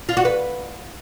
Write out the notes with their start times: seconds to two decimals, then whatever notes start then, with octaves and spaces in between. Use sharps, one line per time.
0.09 F4
0.17 F#4
0.25 B4